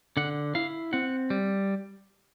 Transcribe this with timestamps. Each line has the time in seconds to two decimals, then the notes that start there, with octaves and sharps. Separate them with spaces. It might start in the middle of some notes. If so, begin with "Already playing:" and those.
0.17 D3 F#5
0.55 E4 F5
0.93 C4 F#5
1.30 G3